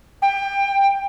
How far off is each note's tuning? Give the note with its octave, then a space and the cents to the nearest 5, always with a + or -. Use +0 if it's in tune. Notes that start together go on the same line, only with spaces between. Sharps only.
G5 +25